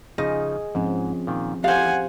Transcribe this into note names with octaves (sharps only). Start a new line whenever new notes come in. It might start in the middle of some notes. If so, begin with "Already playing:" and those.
C#3 F3 D#4 G#4 D#5
G#2 F3 C4 C#4
A#2 D#3
F3 F4 G4 A4 C5 F5 F#5 G#5